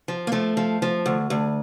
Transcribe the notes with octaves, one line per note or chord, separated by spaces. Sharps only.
F3
A#3
F3 A3
F3
F3
D2
D2